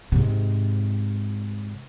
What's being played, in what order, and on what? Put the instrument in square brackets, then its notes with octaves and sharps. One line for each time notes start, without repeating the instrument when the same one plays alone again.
[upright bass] G#2 C3